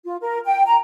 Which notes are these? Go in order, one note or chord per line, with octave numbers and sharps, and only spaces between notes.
F4
A#4
G5
A#5